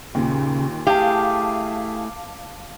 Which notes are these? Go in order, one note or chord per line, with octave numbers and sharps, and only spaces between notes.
D#2 A#2 C#3
A3 E4 G4 G#4 F5 A5